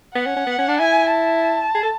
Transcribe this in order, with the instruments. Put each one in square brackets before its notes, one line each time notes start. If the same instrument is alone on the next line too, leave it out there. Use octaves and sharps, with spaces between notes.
[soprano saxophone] B3 [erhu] F#5
[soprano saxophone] C#4
C#4
B3
C#4
D4
[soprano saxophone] E4 [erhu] G#5
[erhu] A5
[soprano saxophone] G#4
A4